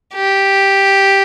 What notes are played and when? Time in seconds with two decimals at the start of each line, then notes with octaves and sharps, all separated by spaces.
0.14 G4